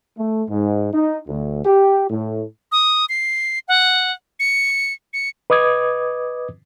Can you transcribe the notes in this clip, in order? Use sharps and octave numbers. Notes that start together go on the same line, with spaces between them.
A3
G#2
D#4
D2
G4
A2
D#6
C7
F#5
C#7
C#7
B4 D#5 D6 D#6 G#6